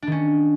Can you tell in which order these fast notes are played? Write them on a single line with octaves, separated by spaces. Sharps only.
D4 D#3 C#4